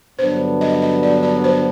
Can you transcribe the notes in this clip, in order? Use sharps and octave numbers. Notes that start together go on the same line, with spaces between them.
G2 D3 F#3 B3 D4 C5
D#5
D#5
D5
D5
C5